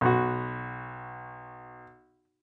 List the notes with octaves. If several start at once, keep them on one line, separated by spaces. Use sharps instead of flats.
B1 F#4